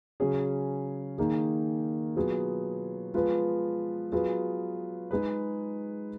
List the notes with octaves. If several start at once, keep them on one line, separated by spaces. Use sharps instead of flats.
C#3 F#3 C#4 G#4
D#3 A#3 D#4 G#4
B2 F#3 B3 F4 G#4
F3 G#3 B3 F4 B4
F#3 B3 F4 G#4 B4
G#3 D#4 G#4 B4